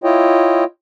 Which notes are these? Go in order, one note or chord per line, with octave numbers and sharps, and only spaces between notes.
E4 F4 C#5 D#5 G5